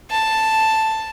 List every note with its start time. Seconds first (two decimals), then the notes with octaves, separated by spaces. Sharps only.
0.11 A5